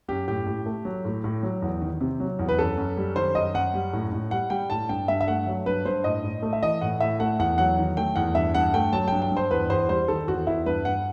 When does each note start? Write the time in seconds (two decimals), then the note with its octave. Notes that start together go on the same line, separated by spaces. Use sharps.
0.08 F#2 G4
0.28 A2 G4
0.46 A2
0.66 A3
0.85 F#3
1.05 A2
1.24 A2
1.43 F#3
1.62 E2
1.82 D#3
2.01 C3
2.20 F#3
2.39 E2
2.49 B4
2.58 F#2 A4
2.77 F#2
2.97 G3
3.16 D#3 C5
3.35 F#2 D#5
3.54 F#2 F#5
3.74 G3
3.93 A2
4.12 A2
4.31 G3 F#5
4.50 G3 G5
4.70 A2 A5
4.89 G2 G5
5.08 G2 E5
5.21 E5
5.27 A3 F#5
5.47 F#3
5.66 G2 B4
5.85 G2 C5
6.04 A2 D#5
6.24 A2
6.42 A3
6.53 E5
6.62 E3 D#5
6.81 A2 F#5
7.01 A2 E5
7.20 A3 F#5
7.39 E2 F#5
7.58 F#3 F#5
7.78 D#3
7.97 A3 G5
8.16 E2 F#5
8.35 G2 E5
8.55 G2 F#5
8.74 A3 G5
8.93 F#3 A5
9.08 G2 G5
9.22 G5
9.31 G2
9.37 C5
9.51 E2 B4
9.70 E2 C5
9.89 G3 C5
10.08 D#3 A4
10.28 E2 F#4
10.47 E2 E4
10.66 G2 B4
10.85 G2 F#5